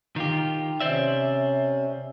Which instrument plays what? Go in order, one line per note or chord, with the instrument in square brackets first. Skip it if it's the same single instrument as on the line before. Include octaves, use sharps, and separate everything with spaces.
[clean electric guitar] D#3 F4 G4
[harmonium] C3 C#4 [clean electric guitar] C5 D5 E5